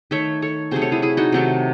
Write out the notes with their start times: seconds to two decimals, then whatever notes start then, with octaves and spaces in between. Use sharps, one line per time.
0.11 D#3 A3 C#5 E5
0.42 A4 C#5
0.71 C3 F#3 A3 G#4 C5
0.82 A4 C#5
0.92 E4 G#4
1.02 E4 G#4
1.17 D#4 F#4
1.32 C3 D#3 F#3 A3